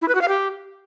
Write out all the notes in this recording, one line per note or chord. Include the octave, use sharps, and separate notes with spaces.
E4
B4
F#4
F5
G4